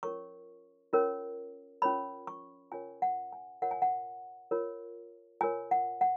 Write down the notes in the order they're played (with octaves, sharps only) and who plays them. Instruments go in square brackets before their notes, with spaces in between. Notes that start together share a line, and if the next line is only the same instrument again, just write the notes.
[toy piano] C#4 F4 A#4 C#5 C#6
C#4 F4 A#4 C#5
C#4 F4 A#4 C#5 B5
C#6
C#4 F4 A#4 C#5 G#5
F#5
G#5
F4 A#4 C#5 F#5
G#5
F#5
F4 A#4 C#5
F4 A#4 C#5 G#5
F#5
F#5